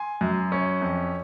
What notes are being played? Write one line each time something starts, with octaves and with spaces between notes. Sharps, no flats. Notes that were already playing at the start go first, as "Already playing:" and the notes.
Already playing: G#5 C6
F#2
C#4
F2